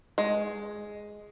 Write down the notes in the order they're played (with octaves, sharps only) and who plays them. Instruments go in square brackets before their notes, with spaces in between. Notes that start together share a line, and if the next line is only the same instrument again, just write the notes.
[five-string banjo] G#3